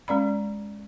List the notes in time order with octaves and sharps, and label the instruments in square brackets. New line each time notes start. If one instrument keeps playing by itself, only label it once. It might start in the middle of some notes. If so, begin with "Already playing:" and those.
[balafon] G#3 C#4 D5 B5